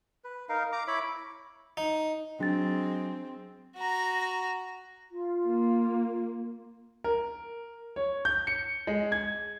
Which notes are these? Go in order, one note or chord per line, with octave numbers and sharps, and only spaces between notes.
B4
D#4 A#4 F5
A#5 D6
E4 C#5 B5 D6
D#4
F#3 G#3 C4 D4 A6
F#4 A#5
F4
A#3
A#4
C#5
G6
C#7
G#3
G#6